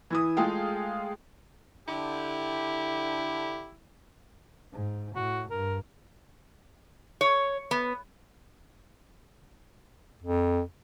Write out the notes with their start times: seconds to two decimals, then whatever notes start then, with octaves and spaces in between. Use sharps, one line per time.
0.10 E3 E4 D#6
0.37 G#3 A3 F4 G#4 F5 G5
1.88 D3 E4 G4
4.72 G#2
5.16 A2 F#4
5.51 G2 A#4
7.21 C#5
7.71 B3
10.23 F2